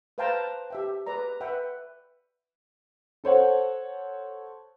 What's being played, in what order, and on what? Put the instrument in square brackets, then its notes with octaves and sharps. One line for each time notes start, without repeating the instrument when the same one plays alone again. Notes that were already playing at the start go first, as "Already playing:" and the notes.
[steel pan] B4 C5 F5 G5 A5 A#5
G4 E5 G5
G#4 B4 D5 A#5
B4 E5 F#5 G5
[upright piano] A4 C5 C#5 F#5